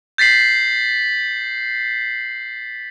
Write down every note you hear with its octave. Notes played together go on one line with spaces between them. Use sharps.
G6 A6 B6 C7 F#7